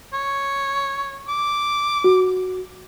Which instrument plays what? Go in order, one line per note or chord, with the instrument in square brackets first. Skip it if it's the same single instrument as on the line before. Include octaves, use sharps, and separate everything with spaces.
[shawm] C#5
D6
[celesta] F#4